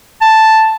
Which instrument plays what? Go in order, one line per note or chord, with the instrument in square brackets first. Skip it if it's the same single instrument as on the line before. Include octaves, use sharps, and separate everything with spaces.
[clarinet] A5